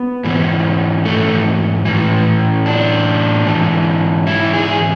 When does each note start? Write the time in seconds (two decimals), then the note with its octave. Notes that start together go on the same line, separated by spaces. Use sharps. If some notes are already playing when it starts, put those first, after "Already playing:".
Already playing: B3
0.24 G#2 E3
1.05 A3
1.85 A2 E3
2.66 D4
3.46 G#2 E3
4.27 E4
4.54 G#4